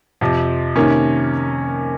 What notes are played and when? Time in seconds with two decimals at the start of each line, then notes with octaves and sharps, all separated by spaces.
0.21 F2 C3 F3
0.76 C3 D#3 A#3 C#4